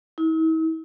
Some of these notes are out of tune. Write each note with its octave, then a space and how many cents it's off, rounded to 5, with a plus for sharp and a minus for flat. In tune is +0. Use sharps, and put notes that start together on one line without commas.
E4 -45